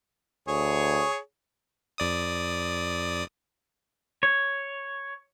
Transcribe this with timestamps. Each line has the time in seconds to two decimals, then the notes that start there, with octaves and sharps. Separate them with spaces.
0.48 D2 G#4 C#5
1.98 F2 D5 D#6
4.23 C#5